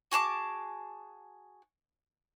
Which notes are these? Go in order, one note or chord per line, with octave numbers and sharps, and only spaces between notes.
F#4 G#4 A5 D6